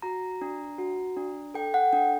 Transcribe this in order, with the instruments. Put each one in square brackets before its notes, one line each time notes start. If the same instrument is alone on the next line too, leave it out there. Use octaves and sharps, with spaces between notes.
[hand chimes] F#4 A#5
D4
F#4
D4
A4 G5
F#5
D4 G5